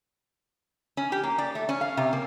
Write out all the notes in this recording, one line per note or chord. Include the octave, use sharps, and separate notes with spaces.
C#4
G4
A#3
D5
A3
C#4
F5
C3
A#3